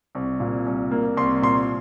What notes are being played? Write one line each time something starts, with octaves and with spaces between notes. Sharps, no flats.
C2
A#2
C2
A#3
C2 C6
A#2 C6